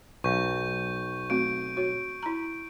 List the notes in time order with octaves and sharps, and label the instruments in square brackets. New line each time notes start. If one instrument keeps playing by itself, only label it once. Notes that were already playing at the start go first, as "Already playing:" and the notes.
[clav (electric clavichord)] B1 [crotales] C#6 G6
[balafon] A3 C4 F#4 [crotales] D7
[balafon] F#4 C#5
E4 A#5